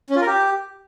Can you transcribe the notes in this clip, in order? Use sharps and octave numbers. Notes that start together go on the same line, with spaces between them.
C#4
F4
A#4
G4